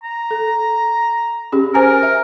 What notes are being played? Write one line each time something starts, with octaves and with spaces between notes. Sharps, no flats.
A#5
A4
C#4 G4 G#4
A#4 C5 G#5 A#5
E5